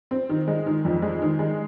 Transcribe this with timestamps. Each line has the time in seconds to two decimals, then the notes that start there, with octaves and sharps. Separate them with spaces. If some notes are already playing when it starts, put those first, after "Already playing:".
0.11 C4
0.29 D#3
0.48 G#3
0.66 D#3
0.85 F2
1.02 G#3
1.22 D#3
1.39 G#3